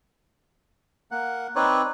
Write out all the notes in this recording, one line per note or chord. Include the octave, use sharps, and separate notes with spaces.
A#3 F#5
C4 D#4 B4 C#5 D5